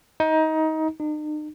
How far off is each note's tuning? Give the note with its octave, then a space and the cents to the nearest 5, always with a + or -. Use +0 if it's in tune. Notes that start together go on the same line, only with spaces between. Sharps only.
D#4 +20
D#4 -45